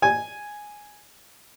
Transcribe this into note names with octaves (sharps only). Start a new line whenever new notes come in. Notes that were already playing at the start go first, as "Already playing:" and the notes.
G#5